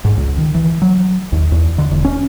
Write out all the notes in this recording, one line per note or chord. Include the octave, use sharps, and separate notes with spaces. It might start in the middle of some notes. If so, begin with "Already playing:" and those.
G#2
C#2
D#3
E3
F#3
D#2
E2
D3
E1
C#4